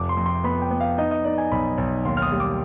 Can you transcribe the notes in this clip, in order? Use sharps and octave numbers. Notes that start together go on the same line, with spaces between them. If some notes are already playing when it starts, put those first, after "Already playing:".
Already playing: F1 D6
C6
F2
C6
B3 B5
G5
B3
F5
D#4 D#5
D#5
D#4 D5
G#5
B1 B5
B1
D#2 C6
F6
D#6
G3
D6